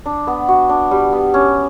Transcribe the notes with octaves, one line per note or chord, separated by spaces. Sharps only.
D4
B3
F#4
D4
G3
B3
C#4